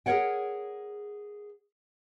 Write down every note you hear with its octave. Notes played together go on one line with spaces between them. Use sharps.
G#4 A#4 B4 C#5 F#5 G5